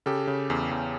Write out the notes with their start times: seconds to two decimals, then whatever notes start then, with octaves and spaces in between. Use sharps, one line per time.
0.06 C#3 G4 A4
0.27 C#3
0.50 E2
0.71 E2